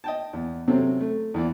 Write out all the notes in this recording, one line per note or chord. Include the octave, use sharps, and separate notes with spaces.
D#5 G5 A5
E2
C3 F#3 C4 C#4 A4
A3
E2 E3 D5